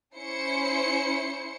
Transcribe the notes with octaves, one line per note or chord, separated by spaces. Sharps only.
C#4 E4 C5 C#7